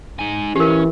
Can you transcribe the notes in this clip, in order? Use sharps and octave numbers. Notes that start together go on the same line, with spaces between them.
D#4 G#5
E3 C#4 G4 A#4